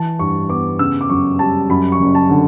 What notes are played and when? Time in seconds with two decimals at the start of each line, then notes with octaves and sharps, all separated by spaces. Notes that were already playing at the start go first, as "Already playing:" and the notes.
Already playing: E3 A5
0.19 G2 C#6
0.49 B3 D6
0.79 C#3 E6
1.01 D6
1.09 F#2 C#6
1.39 G3 A5
1.70 F#2 B5
1.92 C#6
2.00 F#1
2.15 A5
2.29 D3